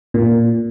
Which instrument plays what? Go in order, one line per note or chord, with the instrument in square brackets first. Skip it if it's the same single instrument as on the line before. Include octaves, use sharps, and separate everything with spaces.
[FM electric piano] A#2